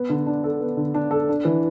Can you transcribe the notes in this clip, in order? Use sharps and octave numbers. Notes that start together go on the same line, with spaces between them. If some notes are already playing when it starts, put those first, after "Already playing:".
Already playing: B3
D3
D4
A4
B3
D3
D4
A4
D4
E3